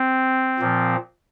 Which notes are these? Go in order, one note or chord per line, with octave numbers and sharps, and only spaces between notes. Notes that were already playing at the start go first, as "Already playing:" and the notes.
Already playing: C4
A#2 F3